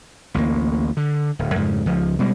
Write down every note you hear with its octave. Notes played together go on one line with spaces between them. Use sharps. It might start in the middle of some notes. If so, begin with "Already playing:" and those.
A1 D2 A#3
D3
D1
F2 G#2 C#3
C#2 F3
B2 G3 G#3